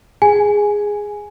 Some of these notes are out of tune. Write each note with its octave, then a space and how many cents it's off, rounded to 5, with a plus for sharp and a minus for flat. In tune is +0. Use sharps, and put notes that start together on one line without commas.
G#4 -5 G#5 +0